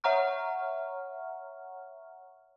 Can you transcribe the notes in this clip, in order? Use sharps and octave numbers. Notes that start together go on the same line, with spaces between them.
C#5 E5 F#5 A#5 C#6 F6